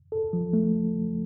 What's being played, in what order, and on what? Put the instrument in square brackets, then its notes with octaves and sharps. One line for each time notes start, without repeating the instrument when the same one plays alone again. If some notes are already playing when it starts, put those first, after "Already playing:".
[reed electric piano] A4
F3
A3